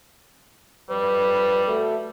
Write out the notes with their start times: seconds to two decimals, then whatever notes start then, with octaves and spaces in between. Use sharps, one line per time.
0.90 F2 G3 B4
1.68 A3 F#4 A4